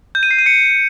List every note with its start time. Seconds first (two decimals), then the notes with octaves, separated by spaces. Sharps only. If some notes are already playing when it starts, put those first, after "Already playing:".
0.15 G6
0.23 D#7
0.31 C7
0.38 D#7
0.46 C#7